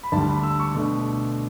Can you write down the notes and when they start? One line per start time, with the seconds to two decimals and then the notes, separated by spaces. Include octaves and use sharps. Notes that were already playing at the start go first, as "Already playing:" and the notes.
0.03 B5
0.12 D2 D3 G3 D4 A5
0.28 B5
0.43 E6
0.60 C#6
0.74 B2 A3 D4